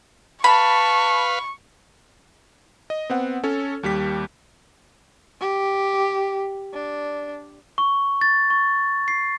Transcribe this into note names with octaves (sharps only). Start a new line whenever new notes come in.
B4 F5 A5 B5 C#6
D#5
B3 C4 F#5
C#4 A4 C#5
D#2 G3 G4 B6
G4
D4
C#6
A6
C#6
C7